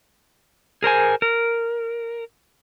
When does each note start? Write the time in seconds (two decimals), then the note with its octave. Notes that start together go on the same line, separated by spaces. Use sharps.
0.83 G#4 A#4 C5 G#5
1.22 A#4